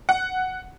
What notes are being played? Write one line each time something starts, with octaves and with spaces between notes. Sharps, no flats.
F#5